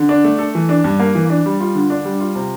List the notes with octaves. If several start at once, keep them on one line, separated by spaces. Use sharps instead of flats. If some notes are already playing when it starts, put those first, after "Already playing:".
Already playing: D3
D4
A3
A4
E3
D4
G2
A#3
E3
D4
G3
F4
D3
D4
G3
F4
C3